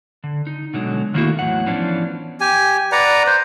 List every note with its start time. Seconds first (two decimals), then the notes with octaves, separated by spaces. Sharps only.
0.24 D3
0.47 D#4
0.74 B2 D3 F#3 G#3
1.14 D#3 F#3 A3 A#3 E4 F#4
1.39 E2 A2 F#3 F#5
1.66 E3 F3 B3 C#4 D4
2.41 G4 G#5
2.92 B4 D5 F#5 A#5
3.27 C5